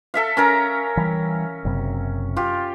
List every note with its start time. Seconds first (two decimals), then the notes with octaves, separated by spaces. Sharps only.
0.14 A4 E5 F5
0.37 C#4 A#4 A#5
0.97 E3 G3
1.65 F#1 F#2 C3
2.36 F4 G4